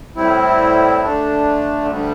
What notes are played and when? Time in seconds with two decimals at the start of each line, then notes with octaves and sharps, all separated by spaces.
0.16 A2 G3 C4 E4
1.01 D3 A3 D4
1.86 D2 D3 G3